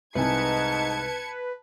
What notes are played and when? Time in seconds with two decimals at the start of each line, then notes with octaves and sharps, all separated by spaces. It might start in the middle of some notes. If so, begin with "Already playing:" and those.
0.15 C2 G#2 D#4 B4 G#5 A5 G#6 C#7